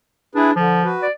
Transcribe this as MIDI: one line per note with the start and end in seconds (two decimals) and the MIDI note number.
0.35 0.54 62
0.35 0.51 64
0.35 0.51 68
0.35 0.51 71
0.55 0.82 50
0.55 0.93 53
0.84 1.07 66
0.84 1.07 71
1.03 1.11 74